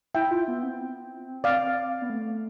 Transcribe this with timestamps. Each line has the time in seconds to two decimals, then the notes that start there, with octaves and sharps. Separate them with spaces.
0.15 E4 E5 G5
0.31 F4
0.48 B3
0.63 C4
1.44 D5 F5
2.02 B3
2.10 A3